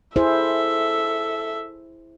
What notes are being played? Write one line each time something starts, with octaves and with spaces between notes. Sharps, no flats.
E4 G#4 A4 C5 E5